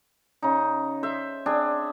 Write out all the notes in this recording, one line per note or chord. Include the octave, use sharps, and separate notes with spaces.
C#3 D#4
C5 E5
C4 D4 G#4